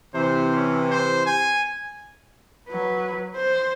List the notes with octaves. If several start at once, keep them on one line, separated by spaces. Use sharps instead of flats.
C3 E3 C5
C#4
C5
G#5
F#3 B4
C5